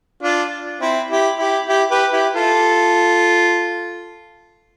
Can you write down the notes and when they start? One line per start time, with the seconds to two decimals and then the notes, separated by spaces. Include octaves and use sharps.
0.22 D4 F4
0.81 C4 E4
1.10 E4 G4
1.39 E4 G4
1.68 E4 G4
1.91 G4 B4
2.13 E4 G4
2.34 F4 A4